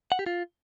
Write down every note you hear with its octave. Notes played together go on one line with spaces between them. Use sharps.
F#5
G4
F4